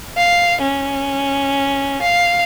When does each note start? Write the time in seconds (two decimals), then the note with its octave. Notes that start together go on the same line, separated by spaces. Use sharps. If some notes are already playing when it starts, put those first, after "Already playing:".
0.17 F5
0.62 C#4
2.02 F5